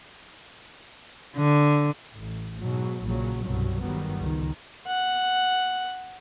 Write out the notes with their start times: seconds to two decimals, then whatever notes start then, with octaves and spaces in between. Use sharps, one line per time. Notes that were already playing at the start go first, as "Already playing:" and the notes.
1.37 D3
2.14 A1
2.61 G#2 B2 F#3
3.04 A#1 A#2 C#3 F#3
3.44 C2 G2 B2 F#3 G3
3.79 G1 G2 D#3 F#3 G3 B3
4.20 C#2 D#3
4.87 F#5